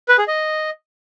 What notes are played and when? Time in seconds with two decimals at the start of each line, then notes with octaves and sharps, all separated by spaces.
0.09 B4
0.18 G#4
0.28 D#5